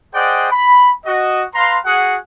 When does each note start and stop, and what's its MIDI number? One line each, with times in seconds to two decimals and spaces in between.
0.14 0.51 68
0.14 0.51 72
0.14 0.51 74
0.14 0.51 75
0.14 0.51 78
0.14 0.51 79
0.51 0.92 83
1.05 1.45 66
1.05 1.45 75
1.54 1.77 71
1.54 1.77 77
1.54 1.77 82
1.54 1.77 84
1.86 2.17 66
1.86 2.17 68
1.86 2.17 78